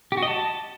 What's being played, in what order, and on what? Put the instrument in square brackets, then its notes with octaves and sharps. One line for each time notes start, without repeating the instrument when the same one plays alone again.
[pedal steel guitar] G4
F#4
D#5
A5